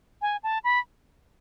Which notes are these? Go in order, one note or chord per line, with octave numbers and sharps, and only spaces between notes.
G#5
A5
B5